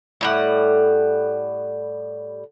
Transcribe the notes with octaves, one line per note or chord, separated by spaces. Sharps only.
A2 G3 F#5